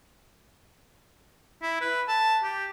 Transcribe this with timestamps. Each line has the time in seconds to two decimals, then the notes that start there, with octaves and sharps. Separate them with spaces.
1.62 E4
1.81 B4
2.08 A5
2.44 G4